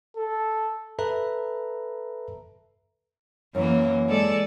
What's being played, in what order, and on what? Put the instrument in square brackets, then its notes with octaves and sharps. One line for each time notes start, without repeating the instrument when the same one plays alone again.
[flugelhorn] A4
[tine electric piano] A4 B4 E5 A#5
[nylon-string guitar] F#2 [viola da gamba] E3 A#3
[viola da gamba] G#3 A4 D5